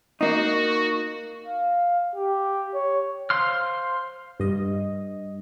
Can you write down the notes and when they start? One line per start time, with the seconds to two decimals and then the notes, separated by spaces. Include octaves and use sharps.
0.21 A#3 D#4 F#4
1.47 F5
2.15 G4
2.74 C#5
3.30 C5 F5 C6 F6
4.40 G2 D#5